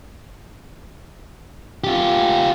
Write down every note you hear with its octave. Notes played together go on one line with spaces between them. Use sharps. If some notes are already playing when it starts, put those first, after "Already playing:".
F4 G4